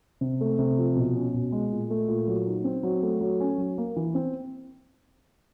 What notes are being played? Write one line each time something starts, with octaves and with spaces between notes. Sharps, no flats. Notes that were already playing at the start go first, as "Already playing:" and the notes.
C3
A3
C3
F3
B2
C#4
B2
G#3
A#2
A3
A#2
F#3
D#4
C4
F#3
A3
F#3
C#4
F#3
A#3
E3
C4